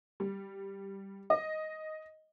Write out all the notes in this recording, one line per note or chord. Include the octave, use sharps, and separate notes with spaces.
G3
D#5